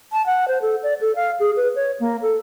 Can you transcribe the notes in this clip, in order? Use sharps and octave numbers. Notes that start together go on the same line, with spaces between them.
A5
F#5
C5
A4
D5
A4
F5
G#4
B4
C#5
A#3
A4